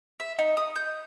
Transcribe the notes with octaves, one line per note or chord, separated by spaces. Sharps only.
E5
D#4
D#6
G6